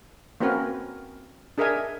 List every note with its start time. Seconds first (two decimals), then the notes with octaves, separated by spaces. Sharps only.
0.40 A#3 C4 C#4 F#4 A#4 B4
1.58 D4 G#4 A#4 D#5 E5 G#5